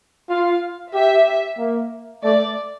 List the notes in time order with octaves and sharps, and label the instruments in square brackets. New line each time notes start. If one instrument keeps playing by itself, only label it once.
[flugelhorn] F4 [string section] F5
[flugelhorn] G4 [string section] E5
[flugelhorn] A#3
[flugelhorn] A3 [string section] D5